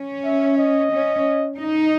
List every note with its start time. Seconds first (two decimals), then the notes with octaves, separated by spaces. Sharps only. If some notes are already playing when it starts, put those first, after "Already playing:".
Already playing: C#4
0.25 E5
0.58 D#5
0.92 C#4
1.59 D#4